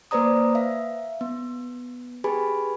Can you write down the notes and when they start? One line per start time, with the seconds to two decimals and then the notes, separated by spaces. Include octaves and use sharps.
0.11 A#3 B4 C5 D5 A#5 D#6
0.55 E5 F5
1.21 B3
2.24 G4 G#4 B4 G#5 B5